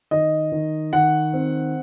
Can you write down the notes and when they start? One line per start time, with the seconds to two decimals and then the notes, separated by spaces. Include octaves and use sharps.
0.11 D#3 D#5
0.52 D#3
0.93 D#3 F#5
1.33 C4